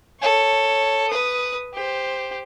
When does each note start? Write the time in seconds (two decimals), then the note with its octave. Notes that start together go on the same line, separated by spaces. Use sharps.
0.20 A4 C#5
1.09 B4 D#6
1.74 G4 C5